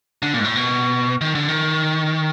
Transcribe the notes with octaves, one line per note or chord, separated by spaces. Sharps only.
D3
A#2
G#2
A2
B2
D#3
D3
D#3